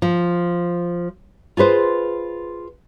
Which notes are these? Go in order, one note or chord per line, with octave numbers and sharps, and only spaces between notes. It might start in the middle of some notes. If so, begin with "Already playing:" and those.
F3
F4 G#4 B4 C5